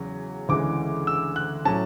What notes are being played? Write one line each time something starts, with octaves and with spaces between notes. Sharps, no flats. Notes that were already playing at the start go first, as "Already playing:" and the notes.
Already playing: E2 C#3 F#3 C#4
D2 C#3 E3 G#3 D6
E6
F#6
A2 F#3 C#4 A5